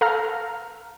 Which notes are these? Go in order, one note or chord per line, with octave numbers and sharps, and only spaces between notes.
A4 F5 A#5 F6